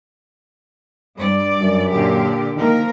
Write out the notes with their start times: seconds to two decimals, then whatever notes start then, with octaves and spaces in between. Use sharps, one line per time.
1.18 G2 D5
1.61 F#2
1.91 A#2 D3 G4
2.57 D#3 F3 A#3 A#4